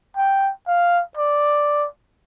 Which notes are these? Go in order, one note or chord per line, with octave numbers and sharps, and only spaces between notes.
G5
F5
D5